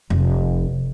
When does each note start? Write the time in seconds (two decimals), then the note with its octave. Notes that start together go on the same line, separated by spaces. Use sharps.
0.10 F1